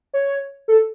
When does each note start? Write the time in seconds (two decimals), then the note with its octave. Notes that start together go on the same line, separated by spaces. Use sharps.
0.14 C#5
0.68 A4